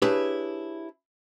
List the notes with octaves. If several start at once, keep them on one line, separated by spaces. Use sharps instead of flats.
D4 E4 G4 G#4 B4 C#5